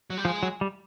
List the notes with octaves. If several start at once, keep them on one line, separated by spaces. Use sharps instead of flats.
F#3
G3
F3 G#3
F#3
G3